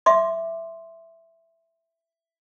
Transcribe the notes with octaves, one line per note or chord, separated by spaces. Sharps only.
E5 C6 D6